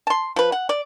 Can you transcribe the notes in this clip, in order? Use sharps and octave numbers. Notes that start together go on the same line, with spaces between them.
A5 C6
F3 B4
F#5
D5